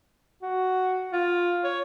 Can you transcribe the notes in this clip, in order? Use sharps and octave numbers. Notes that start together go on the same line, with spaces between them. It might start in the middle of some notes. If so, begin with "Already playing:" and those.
F#4
F4
C#5